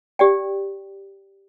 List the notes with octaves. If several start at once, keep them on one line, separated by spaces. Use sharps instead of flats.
G4 D5 G5